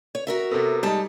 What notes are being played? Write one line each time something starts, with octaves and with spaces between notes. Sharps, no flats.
C#5
F#4 A#4 E5
C3 B3 A4 E6
G3 G#3 D#4 G4 A5